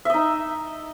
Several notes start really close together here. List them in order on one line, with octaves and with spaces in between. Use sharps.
E5 D#5 D#4